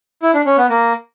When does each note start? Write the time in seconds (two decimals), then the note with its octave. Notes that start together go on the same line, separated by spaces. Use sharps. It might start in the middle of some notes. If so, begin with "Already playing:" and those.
0.22 E4
0.34 D4
0.46 C#4
0.58 B3
0.70 A#3